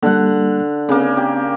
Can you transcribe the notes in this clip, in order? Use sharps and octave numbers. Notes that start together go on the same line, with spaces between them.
D3 G3 A#3 F#5
C#3 A#3 C4
G4